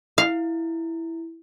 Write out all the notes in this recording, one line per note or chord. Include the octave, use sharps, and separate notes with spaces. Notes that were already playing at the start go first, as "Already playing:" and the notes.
E4 F5